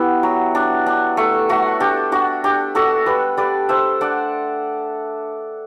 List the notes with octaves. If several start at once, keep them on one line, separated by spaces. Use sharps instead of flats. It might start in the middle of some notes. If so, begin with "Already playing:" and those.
Already playing: B3 E4 G4
F#3
D4
D4
A3
A3 F#4
D4 G4
D4 F#4
D4 G4
D4 F#4 A4
G3 G4 B4
G3 B4 D5
D4 C5 E5
D4 D5 F#5